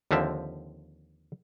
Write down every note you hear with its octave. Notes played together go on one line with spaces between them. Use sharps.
D#2 D3 F3 C4 E5